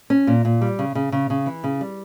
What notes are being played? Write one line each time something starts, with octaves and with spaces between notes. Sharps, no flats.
C#4
A#2
A#2
G3
C#3
C#3
C#3
C#3
E3
C#3
G3